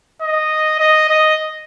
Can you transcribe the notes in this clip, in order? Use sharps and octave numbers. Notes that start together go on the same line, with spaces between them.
D#5
D#5
D#5